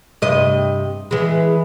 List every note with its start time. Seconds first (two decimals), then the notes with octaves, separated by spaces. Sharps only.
0.22 G2 C3 D#5
1.11 E3 G#3